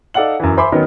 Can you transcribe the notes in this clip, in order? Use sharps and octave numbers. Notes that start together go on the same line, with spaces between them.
D#4 A4 D5 F5 F#5 F#7
F#2 E3
C5 E5 G#5 B5 C6 D6
D#3 F#3 B3 C#4 D#4 A#4